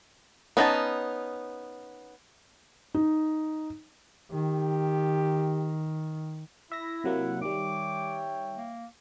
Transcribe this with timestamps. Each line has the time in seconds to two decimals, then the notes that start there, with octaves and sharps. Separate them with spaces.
0.57 B3 C#4 D#4 F#5 A5
2.94 D#4
4.32 D#3 G4
6.72 E4 E5 A#6
7.04 C3 F#3 A#3 F#5
7.41 D#3 G3 C#5 E5 G5 D6
8.57 A#3